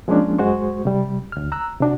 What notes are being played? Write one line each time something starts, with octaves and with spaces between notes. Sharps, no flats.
F3 G#3 A#3 C#4 D4
F#2 G#3 F#4 C5 C#6
C3 G3
D2 F6
A#5 E6 F#6
C3 D4 F#4